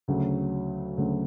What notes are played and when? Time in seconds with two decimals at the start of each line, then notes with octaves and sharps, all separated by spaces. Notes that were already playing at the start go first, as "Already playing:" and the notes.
0.08 D2 C#3 F#3
0.98 D2 C#3 F#3